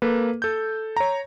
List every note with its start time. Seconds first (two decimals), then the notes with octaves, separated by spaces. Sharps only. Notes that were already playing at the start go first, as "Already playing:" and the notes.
0.02 A#3 A4 B4
0.42 A4 G6
0.97 C#5 A#5